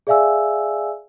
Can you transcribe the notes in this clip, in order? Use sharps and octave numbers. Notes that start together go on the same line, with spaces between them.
G#4 D5 E5 F5 G#5 E6